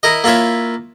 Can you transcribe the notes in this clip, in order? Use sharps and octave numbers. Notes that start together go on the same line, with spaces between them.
E4 A#4 D#5
A#3 E4 F4 C#5 E5